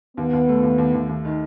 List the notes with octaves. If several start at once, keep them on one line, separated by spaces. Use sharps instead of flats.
D#2 B3
D#2
A3
D#2
D#2
D#2
D#2
D#3